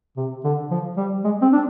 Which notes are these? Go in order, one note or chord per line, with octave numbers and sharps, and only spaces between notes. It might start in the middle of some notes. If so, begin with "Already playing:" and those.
C3
D3
F3
G3
G#3
C4
D4